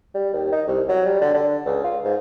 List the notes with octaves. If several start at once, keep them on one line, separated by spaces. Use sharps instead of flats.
G3
D#2
D#4
C2
F#3
G3
D3
D3
C#2
F4
G#2